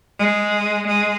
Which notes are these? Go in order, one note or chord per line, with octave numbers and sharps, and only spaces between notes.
G#3
G#3